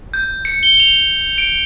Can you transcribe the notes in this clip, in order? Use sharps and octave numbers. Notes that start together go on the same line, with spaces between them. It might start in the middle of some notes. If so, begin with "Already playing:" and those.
G6
C#7
G7
F7
D7